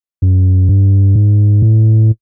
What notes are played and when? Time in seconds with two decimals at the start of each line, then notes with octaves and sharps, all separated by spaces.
0.22 F#2
0.69 G2
1.15 G#2
1.62 A2